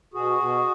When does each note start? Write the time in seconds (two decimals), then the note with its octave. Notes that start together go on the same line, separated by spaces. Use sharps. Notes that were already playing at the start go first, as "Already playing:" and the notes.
0.14 B2 F#4 G#4
0.37 B2